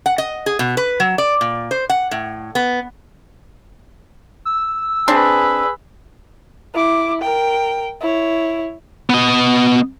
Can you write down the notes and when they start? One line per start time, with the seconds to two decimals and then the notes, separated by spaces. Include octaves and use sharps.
0.06 F#5
0.18 D#5
0.46 G#4
0.59 B2
0.77 B4
1.00 F#3
1.18 D5
1.41 A#2
1.71 C5
1.89 F#5
2.11 A2
2.55 B3
4.45 E6
5.08 C4 D4 G#4 B4
6.74 E4 D6
7.21 A#4 G5
8.01 E4 C#5
9.10 B3 D#5